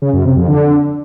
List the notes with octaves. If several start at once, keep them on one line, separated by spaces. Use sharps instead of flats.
C#3
F#2
C3
F2
D3